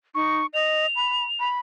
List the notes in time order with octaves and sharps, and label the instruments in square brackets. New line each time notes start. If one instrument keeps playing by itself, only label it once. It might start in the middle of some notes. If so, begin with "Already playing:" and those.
[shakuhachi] D#4 [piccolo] C#6
[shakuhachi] D#5 [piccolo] F7
[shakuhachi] B5
B5